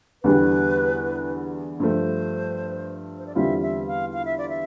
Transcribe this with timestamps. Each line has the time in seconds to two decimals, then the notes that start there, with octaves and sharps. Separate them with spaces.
0.23 E2 D3 G3 D4 G4 B4
1.80 G2 F3 A3 C5
3.18 C5
3.27 D5
3.35 E2 D3 G3 C4 F4 E5
3.62 E5
3.87 F5
4.13 F5
4.25 E5
4.38 D5
4.49 E5